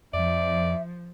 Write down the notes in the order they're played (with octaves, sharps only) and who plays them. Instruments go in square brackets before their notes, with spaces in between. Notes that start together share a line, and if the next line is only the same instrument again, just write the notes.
[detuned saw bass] F2 [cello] F3 [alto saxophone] D5 [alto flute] E5